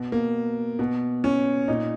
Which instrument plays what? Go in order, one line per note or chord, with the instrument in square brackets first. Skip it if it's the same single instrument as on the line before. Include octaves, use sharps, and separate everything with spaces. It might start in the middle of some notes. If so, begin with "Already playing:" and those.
Already playing: [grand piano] B2
A#3
B2
C#4
A#2 D#4